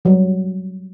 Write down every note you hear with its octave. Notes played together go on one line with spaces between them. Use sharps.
F#3 G3